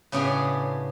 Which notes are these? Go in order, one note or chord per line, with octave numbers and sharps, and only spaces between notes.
A2 C#3 B3 D4 G4 G#4